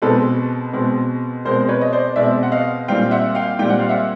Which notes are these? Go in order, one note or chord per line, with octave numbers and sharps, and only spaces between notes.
B2 G#3 C4 A4 B4
B2 G#3 C4
B2 G#3 C4 A#4 C5
C5
B4 C#5
D#5
C5 D5
B2 G#3 C4 D5 E5
F#5
D#5 F5
A#2 G3 C4 F5 G5
E5 F#5
F5 G5
A#2 G3 C4 G5
F#5
F5
E5 F#5